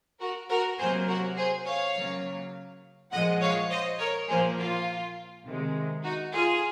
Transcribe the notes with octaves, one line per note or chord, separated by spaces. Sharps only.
F#4 A#4
F#4 A#4
C3 F#3 A#3 G#4 C5
F#4 A#4
G#4 C5
C#5 F5
C#3 F#3 A#3
A#2 F3 G#3 D#5 F#5
C#5 F5
C5 D#5
A#4 C#5
A#2 F3 A#3 G#4 C5
F4
C3 D#3 G#3
D#4 F#4
F4 G#4